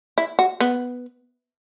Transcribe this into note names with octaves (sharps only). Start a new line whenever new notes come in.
E4
F#4
B3